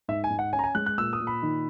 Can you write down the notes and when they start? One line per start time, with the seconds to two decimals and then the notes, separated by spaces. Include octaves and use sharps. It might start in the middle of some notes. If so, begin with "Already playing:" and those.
0.08 G#2 E5
0.24 G#5
0.30 G#2
0.39 F#5
0.53 C#4 G#5
0.59 A#5
0.64 G#5
0.75 G#3 F#6
0.86 F#6
0.98 A#2 E6
1.13 D#6
1.20 A#2
1.27 B5
1.42 D#3